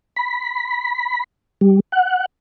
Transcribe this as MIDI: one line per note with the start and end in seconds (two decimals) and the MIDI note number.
0.16 1.24 83
1.61 1.80 55
1.92 2.26 78